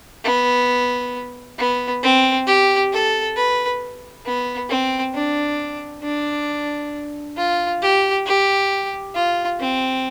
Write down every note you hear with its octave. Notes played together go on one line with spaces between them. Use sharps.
B3
B3
C4
G4
A4
B4
B3
C4
D4
D4
F4
G4
G4
F4
C4